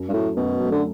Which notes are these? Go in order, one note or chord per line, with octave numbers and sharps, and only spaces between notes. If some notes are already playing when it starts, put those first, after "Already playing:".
Already playing: F#2
G2
A2 F#3 A3
F#2 B2
F#3 A3
D3